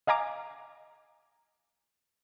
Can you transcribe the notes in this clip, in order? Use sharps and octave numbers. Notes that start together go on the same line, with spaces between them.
D#5 F5 G#5 A#5 D6